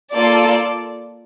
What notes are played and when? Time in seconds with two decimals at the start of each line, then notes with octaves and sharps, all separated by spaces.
0.14 A#3 F4 A4 D5